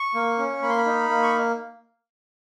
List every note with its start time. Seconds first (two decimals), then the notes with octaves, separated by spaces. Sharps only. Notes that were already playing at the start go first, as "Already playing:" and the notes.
Already playing: C#6
0.15 A#3
0.39 C#4
0.62 A#3 B5
0.69 C6
0.78 B5
0.86 D#4
1.09 A#3
1.23 C#6